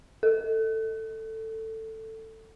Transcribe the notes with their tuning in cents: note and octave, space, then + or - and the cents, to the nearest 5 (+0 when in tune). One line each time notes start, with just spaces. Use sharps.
A4 +15